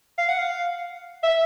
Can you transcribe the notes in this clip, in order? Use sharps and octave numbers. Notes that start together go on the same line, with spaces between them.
F5
F#5
F5
E5